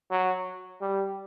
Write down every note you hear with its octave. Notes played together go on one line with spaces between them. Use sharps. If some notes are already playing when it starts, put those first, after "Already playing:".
F#3
G3